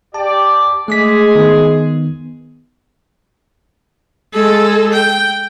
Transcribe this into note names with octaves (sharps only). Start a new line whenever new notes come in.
G4 D5 A5
G#3 A3 G#4 D6 B6
D#3 B3
G#3 A4
G5